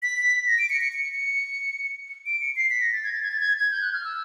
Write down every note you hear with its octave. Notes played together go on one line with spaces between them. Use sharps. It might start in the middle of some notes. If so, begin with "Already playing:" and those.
B6
A#6
D7
C#7
C#7
C#7
C#7
D7
C#7
C7
B6
A#6
A6
G#6
A6
G#6
A6
G#6
G#6
G6
F#6
F6
E6